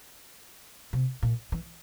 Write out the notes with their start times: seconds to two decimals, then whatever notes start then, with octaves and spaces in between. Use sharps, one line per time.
0.93 C3
1.23 A#2
1.52 E3